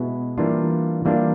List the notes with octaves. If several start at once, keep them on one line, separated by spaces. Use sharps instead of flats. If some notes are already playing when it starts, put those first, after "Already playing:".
Already playing: B2 G#3 B3 E4
E3 G3 A#3 D4 F4
E3 G3 A#3 D4 F4